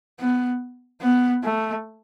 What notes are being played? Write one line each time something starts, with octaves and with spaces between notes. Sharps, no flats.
B3
B3
A3